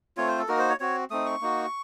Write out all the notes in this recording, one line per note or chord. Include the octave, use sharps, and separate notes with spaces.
A3 C4 F4 C#5
C5
A4
A#3 D#4 F#4 A#4
C5
C#5
C4 F#4 C#5
A3 C4 D#4 D#6
C#6
A#3 D#4 F#4